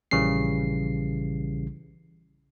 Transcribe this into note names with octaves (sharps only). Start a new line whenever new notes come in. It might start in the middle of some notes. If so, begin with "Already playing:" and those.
A#1 C#3 E3 G3 C7